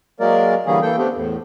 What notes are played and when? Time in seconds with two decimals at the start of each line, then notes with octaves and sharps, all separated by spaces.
0.20 F#3 G#3 A#3 A#4 D5
0.66 D3 E3 G3 A#3 C#4 G#4
0.82 E3 A#3 A4 G5
0.98 A3 B3 C4 D4 G4
1.14 E2 A2